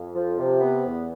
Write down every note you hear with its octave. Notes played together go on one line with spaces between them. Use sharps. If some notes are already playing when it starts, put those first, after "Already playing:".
Already playing: F2
F3
C3
B3
E2